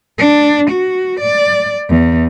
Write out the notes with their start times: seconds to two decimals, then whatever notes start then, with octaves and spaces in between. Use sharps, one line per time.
0.18 D4
0.70 F#4
1.20 D5
1.89 E2